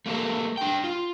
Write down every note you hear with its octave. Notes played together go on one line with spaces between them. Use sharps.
A3 A#3 G4 A4 A#4
D4 G5
F4